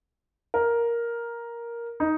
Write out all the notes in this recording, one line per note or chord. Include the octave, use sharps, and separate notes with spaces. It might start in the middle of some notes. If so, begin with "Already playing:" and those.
A#4
D#4